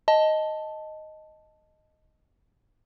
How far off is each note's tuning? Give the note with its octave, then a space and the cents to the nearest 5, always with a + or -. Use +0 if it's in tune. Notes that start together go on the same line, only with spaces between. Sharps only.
D#5 +0 A5 -5